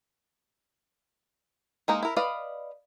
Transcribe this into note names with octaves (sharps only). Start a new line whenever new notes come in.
G#3 A#3 D#4
E4 A#4
B4 D5 D#5 F5